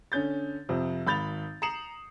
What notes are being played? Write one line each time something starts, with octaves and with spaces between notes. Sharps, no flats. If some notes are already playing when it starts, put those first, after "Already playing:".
D3 C#4 G6 A6
F2 C3
G#1 B5 G6 A6 F7
A#5 D#6 C7 C#7 E7 F#7